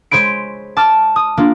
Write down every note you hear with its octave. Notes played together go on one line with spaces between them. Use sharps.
G#3 C5 C#5 B5 D7
A5 D6 F6
D#6
A#3 D4 F4